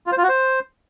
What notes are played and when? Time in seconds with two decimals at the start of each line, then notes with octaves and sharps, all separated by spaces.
0.07 F4
0.12 C5
0.18 F4
0.23 F#4
0.29 C5